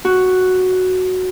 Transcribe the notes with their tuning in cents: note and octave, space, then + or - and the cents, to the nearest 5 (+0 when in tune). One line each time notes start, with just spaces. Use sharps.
F#4 +0